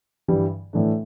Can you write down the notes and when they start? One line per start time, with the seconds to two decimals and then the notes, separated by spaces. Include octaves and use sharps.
0.28 G2 E3 G3
0.73 A2 E3 A3 D4